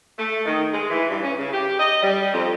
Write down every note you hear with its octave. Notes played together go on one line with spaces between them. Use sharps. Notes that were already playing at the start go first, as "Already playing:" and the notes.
A3
D#3
G#3
E3
G2
C#4
C#3
G4
D#5
G3
F2